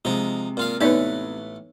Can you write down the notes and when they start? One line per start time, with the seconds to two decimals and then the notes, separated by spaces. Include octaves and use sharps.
0.05 C3 F3 G#3 D#4
0.57 A#2 F4 F5
0.81 A1 A3 B3 D#4 A4 B4 C#5 D5